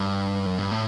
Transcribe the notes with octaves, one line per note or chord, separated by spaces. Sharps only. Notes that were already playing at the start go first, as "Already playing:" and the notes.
Already playing: G2
F#2
G2
A2